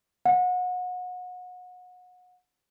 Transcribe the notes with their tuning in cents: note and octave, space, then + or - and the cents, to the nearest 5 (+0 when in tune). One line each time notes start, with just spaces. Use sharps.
F#5 -30